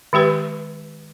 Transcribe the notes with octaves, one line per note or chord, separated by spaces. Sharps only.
D#3 G#3 G4 B4